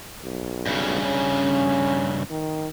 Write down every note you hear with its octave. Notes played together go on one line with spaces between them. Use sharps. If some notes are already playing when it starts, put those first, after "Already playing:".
B1
G2 C#3
C#4
D#3